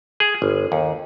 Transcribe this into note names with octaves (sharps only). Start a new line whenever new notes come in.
G#4
G1
D#2